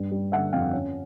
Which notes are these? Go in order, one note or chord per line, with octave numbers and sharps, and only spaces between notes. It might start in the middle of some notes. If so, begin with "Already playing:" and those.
Already playing: G2 G3
G3
D3 E5 F#5
F2 F5 G5
C#4